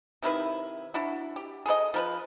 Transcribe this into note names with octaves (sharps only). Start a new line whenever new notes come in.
C3 D#3 E4 B4
D4 E4 F#4
G4
G#4 A4 B4 D#5
F3 A#4 B4